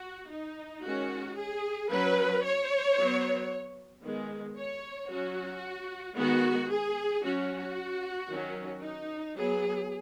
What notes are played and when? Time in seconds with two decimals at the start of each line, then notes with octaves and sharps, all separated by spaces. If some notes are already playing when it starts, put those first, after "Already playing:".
Already playing: F#4
0.31 D#4
0.84 D#3 G#3 C#4 F#4
1.37 G#4
1.90 F#3 C#4 B4
2.44 C#5
2.98 F#3 B3
4.03 D#3 G#3 B3
4.57 C#5
5.10 F#3 C#4 F#4
6.16 D#3 G#3 B3 F#4
6.70 G#4
7.23 F#3 C#4 F#4
8.30 D#3 F#3 C#4
8.83 D#4
9.36 F#3 B3 G#4